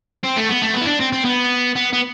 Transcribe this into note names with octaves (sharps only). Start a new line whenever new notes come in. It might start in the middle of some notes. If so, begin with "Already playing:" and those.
C4
A3
B3
A3
B3
E4
D4
C4
C4
B3
B3
B3